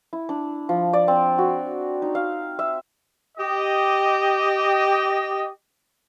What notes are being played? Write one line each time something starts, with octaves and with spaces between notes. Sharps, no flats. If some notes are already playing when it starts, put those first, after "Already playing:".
E4
D4
F3
D5
C4
F#4
D#4
F5
E5
G4 D#5